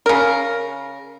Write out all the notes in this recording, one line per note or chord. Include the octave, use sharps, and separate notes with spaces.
C#3 A#4